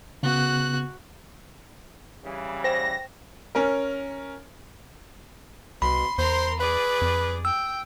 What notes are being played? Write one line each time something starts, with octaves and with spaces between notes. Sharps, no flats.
C#3 B3 F#4 F#6
C#3 E3 G3
C5 G5 A#6
C#4 A#4
C2 B2 B5 C6
E2 A#4 C5 C6
G#4 B4 D5
F2
G5 E6